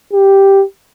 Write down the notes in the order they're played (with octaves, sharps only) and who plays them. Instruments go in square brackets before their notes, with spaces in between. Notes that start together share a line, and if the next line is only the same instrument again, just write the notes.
[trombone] G4